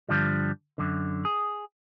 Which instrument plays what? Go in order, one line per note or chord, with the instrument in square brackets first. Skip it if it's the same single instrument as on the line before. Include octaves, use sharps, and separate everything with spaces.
[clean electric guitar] G2 D3 F3 G3
F#2 D3
G#4